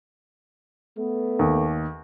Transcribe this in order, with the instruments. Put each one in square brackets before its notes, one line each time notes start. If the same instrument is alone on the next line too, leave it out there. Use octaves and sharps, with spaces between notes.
[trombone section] A3 B3
[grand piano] D#2